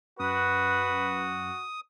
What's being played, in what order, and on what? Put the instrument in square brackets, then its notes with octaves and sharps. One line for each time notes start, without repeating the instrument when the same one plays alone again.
[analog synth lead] F#2 [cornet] F#4 [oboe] B4 [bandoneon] D#6